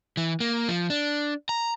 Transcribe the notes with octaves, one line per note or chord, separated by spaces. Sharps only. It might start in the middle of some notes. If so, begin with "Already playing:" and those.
E3
A#3
F3
D4
A#5